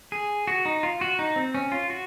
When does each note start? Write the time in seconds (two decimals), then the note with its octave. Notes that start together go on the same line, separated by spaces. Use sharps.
0.12 G#4
0.47 F#4
0.65 D#4
0.83 F4
1.01 F#4
1.19 D#4
1.36 C4
1.55 C#4
1.72 F4
1.90 F#4